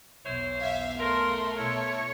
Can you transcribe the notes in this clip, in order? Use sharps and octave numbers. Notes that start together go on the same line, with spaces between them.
B1 E2 E4 C5 C#5
E5 F5
A3 A#4 C6
B2 E4 C#5